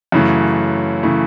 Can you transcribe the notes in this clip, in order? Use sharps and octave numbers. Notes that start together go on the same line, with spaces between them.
F#2 C#3 E3 A3
C#3 E3 A3